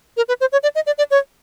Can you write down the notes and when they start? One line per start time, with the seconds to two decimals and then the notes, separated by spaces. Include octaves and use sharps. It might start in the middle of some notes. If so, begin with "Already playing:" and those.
0.17 A#4
0.28 B4
0.41 C5
0.52 C#5
0.63 D5
0.75 D#5
0.86 D5
0.98 D5
1.11 C#5